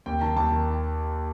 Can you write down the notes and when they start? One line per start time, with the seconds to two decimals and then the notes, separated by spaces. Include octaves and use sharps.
0.06 D#2 G5
0.21 D#3 A5
0.36 D#2 A5
0.51 D#3